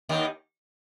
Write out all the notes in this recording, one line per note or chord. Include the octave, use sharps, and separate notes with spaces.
D#2 D#3